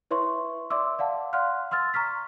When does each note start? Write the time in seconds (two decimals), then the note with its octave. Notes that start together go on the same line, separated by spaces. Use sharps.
0.11 E4 B4 C#5 E5 C6 C#6
0.70 D5 E5 C6 D6 E6
0.99 D5 F5 F#5 A5
1.33 D5 F5 F#5 C6 F6 F#6
1.71 C6 E6 F6 A6
1.94 A#5 C#6 F6 B6